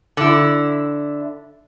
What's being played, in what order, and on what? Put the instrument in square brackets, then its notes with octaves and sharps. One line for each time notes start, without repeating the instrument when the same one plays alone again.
[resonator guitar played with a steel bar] D3 E4